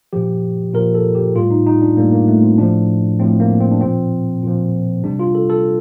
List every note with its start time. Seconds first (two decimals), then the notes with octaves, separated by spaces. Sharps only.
0.13 A#2 F3 G4
0.74 A#2 F3 A#4
0.95 A4
1.15 G4
1.36 A2 G3 F4
1.51 D#4
1.67 D#4
1.82 D4
1.97 A2 G3 A#3
2.12 A#3
2.28 A3
2.43 C4
2.58 A2 F3 D4
3.20 A2 F3 C4
3.40 A#3
3.61 C4
3.72 D4
3.81 A#2 F3 C4
4.43 A#2 F3
5.04 C3 G3 D4
5.19 F4
5.35 A4
5.50 A4